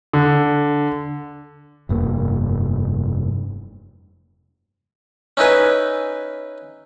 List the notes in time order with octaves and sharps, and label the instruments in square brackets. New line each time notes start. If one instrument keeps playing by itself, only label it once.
[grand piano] D3
[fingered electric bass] F1 G2 A#3
[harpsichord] C#4 D#4 E4 B4 G#5